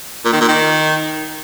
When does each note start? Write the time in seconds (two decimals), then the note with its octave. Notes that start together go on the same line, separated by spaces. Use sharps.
0.25 A#2
0.33 D#3
0.41 A#2
0.49 D#3